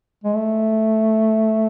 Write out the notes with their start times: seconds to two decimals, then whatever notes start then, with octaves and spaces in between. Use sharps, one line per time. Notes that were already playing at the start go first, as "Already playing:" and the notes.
0.24 G#3
0.35 A3